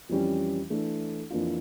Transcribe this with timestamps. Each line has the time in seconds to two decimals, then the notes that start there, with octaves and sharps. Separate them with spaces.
0.09 F2 E3 G3 C#4
0.70 E3 A3 D4 A4
1.30 F2 E3 A#3 D4 F4